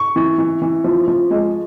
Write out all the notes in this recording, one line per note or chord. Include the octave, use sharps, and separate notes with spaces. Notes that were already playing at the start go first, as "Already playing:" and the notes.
Already playing: C#6
E3
E3
E3
F3
F3
G#3